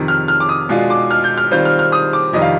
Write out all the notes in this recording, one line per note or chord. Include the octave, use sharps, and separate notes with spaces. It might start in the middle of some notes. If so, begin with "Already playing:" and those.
Already playing: F2 C3 D#3
F6
F6
D6
D#6
B2 G#3 D4 F4
D6
F6
G6
F6
D#3 G3 C4 F4 G6
F6
F6
D#6
D6
F2 C3 D#3 G3 D4 D#5
F5